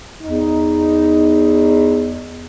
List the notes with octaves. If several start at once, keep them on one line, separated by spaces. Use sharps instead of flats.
E2 D#4